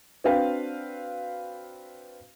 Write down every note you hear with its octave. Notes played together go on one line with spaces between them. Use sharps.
C4 D4 F#4 B4 F5 G5